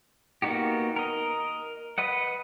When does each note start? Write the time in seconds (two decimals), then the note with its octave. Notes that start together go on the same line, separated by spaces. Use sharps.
0.42 A#3 B3 D#4 F#4 G4
0.96 A#4 D#5
1.98 B4 D#5 F#5